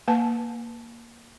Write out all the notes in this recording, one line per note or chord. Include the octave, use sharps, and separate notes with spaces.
A#3 B4 G#5 A5